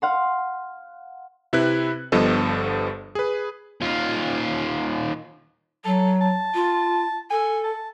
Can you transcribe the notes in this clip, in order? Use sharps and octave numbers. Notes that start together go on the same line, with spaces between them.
F5 F#5 C6
C3 E4 B4 F#6
G1 G2 F3 B3 A4 D#5
G#4 B4
D#2 F4
F#3 A4
A5
F4
A4 G#5
A5